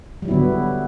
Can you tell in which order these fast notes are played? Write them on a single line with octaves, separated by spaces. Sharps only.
G3 F#3 E4 B3 D3